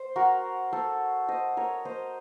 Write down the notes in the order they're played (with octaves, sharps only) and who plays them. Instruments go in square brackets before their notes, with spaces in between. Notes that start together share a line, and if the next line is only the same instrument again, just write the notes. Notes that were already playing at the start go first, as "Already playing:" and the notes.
Already playing: [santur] C5
F#4 A#4
A4 C5
C5 D#5
A#4 C#5
C5 D#5